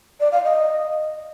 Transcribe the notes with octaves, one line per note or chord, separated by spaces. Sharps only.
D5
F5
D#5